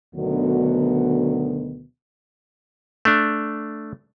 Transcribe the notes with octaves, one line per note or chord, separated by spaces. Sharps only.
D2 B2 D3 D#3 F#3 B3
A3 D4